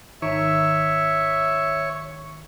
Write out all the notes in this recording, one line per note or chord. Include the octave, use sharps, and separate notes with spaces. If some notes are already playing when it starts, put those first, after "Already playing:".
G#1 D#3 C#5 E5